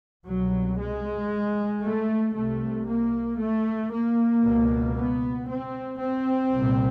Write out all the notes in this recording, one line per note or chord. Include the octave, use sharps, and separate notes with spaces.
C2 B2 F#3
G#3
A3
C2 C3 A3
A#3
A3
A#3
C#2 B2
B3
C4
C4
C2 A#2